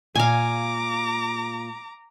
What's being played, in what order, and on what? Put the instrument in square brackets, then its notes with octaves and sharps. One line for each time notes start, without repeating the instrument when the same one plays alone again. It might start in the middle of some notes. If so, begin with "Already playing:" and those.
[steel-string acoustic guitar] A#2 [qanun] F5 G#5 [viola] A#5 D6